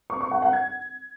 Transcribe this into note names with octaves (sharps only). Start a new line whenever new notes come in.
C#6
C#6
F#5
F#5
G#6